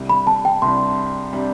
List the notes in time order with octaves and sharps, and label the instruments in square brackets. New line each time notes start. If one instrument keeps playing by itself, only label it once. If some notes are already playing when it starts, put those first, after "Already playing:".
Already playing: [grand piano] C2 C3 G3 D4
[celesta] B5
A5
G5
[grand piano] C2 C3 G3 D4 [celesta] C6
[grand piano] C3 G3 D4